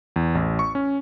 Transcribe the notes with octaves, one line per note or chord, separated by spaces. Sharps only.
E2
A1
C#6
C#4